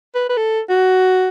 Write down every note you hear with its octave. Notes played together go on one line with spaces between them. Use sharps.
B4
B4
A4
F#4